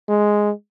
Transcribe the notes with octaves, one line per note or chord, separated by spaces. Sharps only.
G#3